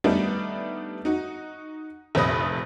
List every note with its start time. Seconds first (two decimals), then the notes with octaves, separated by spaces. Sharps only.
0.04 G3 A3 B3 D4 D#4
1.05 D#4 F#4
2.15 F1 A#1 C3 B4 D#6 A#6